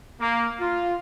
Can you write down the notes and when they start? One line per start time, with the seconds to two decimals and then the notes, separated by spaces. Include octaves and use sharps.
0.19 A#3
0.59 F4